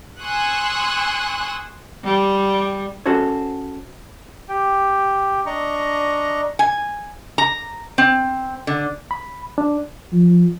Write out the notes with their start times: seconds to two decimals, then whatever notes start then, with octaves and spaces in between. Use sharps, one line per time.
0.22 G#5 C6 C#6 D#6 E6 F#6
2.04 G3
3.06 C#4 F#4 A4 C5 C#5
4.49 G4 G5
5.46 D4 D#5 A#5 C#6
6.59 G#5
7.38 A#5
7.98 C4
8.67 D3
9.11 B5
9.58 D4
10.12 F3